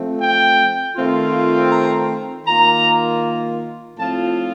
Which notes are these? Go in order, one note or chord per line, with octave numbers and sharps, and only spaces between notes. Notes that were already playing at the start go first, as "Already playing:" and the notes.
Already playing: F3 A3 C4
G5
D#3 A3 C4 F4
A#5
D#3 A#3 F4 A#5
A2 F3 C4 F4 A5